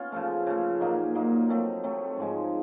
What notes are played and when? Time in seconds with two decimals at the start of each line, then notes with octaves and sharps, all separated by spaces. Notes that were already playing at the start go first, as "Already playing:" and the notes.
Already playing: B3 C#4 F4
0.12 C#3 F3 A3
0.46 C#3 F3 A3
0.80 A#2 F#3 A#3 D#4
1.15 A#2 F#3 A#3 D#4
1.49 F#3 A3 C4
1.83 F#3 A3 C4
2.17 G#2 F3 G#3